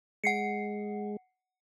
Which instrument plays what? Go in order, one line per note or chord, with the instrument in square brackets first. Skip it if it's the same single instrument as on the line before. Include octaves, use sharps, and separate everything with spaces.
[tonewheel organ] G#3 [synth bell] F#5 C7 C#7